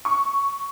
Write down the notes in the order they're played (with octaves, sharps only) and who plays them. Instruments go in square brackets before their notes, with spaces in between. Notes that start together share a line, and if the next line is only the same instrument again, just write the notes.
[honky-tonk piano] C#6